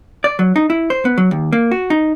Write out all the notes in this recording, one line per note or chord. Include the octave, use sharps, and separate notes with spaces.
D5
F#3
D#4
E4
C5
B3
F#3
D#2
A#3
F#4
D#4